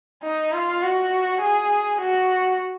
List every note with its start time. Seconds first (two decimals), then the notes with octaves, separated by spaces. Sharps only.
0.22 D#4
0.53 F4
0.82 F#4
1.42 G#4
2.01 F#4